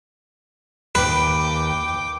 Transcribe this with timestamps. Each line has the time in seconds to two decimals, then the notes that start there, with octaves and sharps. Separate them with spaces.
0.95 D#2 B4 G5 D6